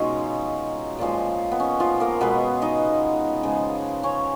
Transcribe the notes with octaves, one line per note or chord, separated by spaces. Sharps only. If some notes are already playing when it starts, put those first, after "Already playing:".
Already playing: B2 G#3 C#4 D#4 F4
A#2 F3 G#3
B3
C#4
F3 F4
A#3 A#4
B2 G#3 B3 B4
D#4 D#5
C#3 F3 G#3
C#4 C#5